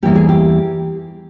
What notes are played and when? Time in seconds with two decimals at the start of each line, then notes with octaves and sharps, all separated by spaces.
0.03 E2 C#3 E3 G3 A#3 G4
0.15 G#4
0.29 G4